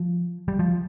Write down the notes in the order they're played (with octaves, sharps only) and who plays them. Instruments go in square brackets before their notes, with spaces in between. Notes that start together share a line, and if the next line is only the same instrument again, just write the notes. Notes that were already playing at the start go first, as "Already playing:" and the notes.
Already playing: [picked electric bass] F3
G3
F3